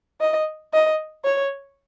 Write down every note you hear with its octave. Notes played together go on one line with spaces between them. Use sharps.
D#5
D#5
C#5